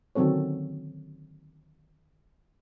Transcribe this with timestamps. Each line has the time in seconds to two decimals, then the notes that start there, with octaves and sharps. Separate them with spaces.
0.15 D3 D#3 F#3 C4 A4 C#5